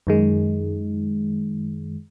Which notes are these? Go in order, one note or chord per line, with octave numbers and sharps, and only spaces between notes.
F#2 D#3 G#3